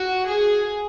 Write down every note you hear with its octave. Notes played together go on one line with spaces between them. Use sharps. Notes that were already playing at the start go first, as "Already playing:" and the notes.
Already playing: F#4
G#4